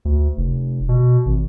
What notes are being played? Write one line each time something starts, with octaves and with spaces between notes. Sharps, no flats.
D2
F1
B2
G#1